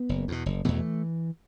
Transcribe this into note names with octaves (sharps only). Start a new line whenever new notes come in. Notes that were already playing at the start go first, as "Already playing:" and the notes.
Already playing: B3
F#1
E2 B2
F#1
E2 B2 E3 A3